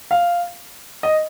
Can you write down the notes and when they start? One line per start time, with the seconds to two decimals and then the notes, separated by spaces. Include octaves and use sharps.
0.11 F5
1.03 D#5